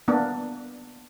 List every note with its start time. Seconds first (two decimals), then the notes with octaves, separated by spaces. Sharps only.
0.08 A#3 B3 D4